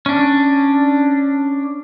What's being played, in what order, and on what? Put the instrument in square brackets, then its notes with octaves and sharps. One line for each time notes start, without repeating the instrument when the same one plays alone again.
[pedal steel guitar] C#4 D4